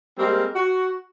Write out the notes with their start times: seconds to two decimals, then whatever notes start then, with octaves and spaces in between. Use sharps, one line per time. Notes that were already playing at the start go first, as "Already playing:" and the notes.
0.18 G3 G#3 A#3 C4
0.56 F#4